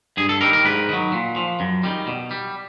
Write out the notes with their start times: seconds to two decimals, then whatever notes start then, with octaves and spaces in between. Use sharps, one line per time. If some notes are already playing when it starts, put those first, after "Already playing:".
0.17 G2 G#4
0.29 A4
0.41 D#3 G3 A#4
0.53 A#4
0.65 G#2 B4
0.89 D#3 F#3
1.13 A#2
1.36 F3
1.60 F#2
1.83 D#3 G3
2.07 B2
2.31 G3